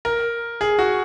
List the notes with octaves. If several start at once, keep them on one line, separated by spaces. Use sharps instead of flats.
A#4
G#4
F#4